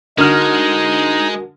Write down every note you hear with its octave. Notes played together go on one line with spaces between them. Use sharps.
D3 G#3 D#4 F#4 A#4 F6